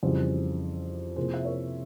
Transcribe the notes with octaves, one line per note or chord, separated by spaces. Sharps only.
F2 C#3 E3 G3 G#4 C5
C3 F3 A#3 E4 G#4 C5
E5
A#4 C#5